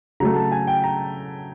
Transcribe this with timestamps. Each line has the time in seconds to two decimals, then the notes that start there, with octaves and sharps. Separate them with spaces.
0.20 C#3 F#3 A3 A#5
0.36 A5
0.52 G#5
0.67 G5
0.84 A#5